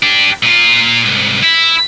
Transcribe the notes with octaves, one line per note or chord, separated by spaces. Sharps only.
D4 G4
A#2 F4
C2 G#2
E4